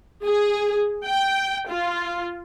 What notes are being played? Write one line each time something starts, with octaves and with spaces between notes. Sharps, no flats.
G#4
G5
F4